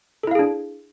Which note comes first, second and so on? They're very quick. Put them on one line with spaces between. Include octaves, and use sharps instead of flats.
A4 E4 F5 G#4 D4